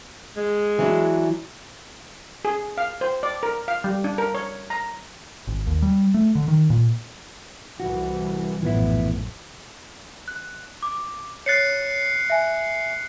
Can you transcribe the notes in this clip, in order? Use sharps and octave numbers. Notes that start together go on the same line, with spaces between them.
G#3
E3 F#3 D4
G#4
F5
C5
D5
A#4
F5
G3
D4
A#4
C#5
A#5
G#1
D#2
G3
A3
D3
D#3
A#2
C2 E3 F#4
A#1 F#2 A2 E3 B3 E4
F#6
D6
C#5 F#6 A6 C7 C#7
E5 G#5